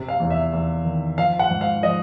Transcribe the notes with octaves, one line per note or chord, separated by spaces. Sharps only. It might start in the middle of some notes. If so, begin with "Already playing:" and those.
Already playing: C3
F5
E2
E5
E2
D#3
F3 F5
F#5
G#2
F5
F3 D#5